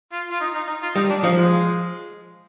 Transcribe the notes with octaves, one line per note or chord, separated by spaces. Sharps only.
F4
F4
D#4
D#4
D#4
F4
G3 D#4
D4
F3 D#4
G#3